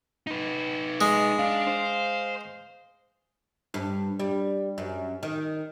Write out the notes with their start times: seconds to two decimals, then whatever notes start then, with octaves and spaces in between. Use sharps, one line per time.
0.27 D#4 B4
1.01 G#3
1.39 D4 F5
1.67 C5
3.74 G2
4.20 G3
4.78 F#2
5.23 D#3